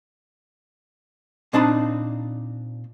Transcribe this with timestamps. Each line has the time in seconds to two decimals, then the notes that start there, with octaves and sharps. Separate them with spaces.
1.53 A#2 C4 D4 D#4 A5 B5